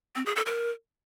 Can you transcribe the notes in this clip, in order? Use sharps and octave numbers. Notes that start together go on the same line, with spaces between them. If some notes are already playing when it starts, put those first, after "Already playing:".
C4
G#4
A4
A#4